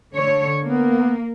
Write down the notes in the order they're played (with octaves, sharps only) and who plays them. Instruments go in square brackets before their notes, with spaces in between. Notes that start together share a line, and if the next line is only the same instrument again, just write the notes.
[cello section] D3 C#5
[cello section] A#3 [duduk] B3